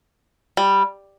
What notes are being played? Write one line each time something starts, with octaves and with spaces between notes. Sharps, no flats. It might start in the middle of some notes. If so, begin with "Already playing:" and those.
G3